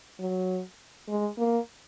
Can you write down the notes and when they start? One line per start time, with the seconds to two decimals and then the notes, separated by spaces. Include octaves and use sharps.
0.19 F#3
1.08 G#3
1.38 A#3